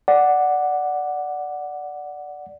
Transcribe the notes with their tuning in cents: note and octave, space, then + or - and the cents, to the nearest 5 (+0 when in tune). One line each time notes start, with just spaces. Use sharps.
D5 +0 F#5 +0